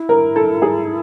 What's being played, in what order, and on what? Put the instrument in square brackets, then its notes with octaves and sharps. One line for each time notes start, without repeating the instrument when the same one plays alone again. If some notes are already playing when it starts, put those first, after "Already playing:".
Already playing: [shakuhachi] E4
[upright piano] A#4
A4
G#4